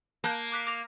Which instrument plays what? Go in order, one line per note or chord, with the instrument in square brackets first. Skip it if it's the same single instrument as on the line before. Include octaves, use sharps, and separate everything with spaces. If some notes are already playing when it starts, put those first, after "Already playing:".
[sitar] A#3 [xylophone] A5 F#6 G6
[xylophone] D6 F#6 B6
D6 A#6 F7